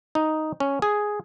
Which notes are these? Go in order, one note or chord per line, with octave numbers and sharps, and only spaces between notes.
D#4
C#4
G#4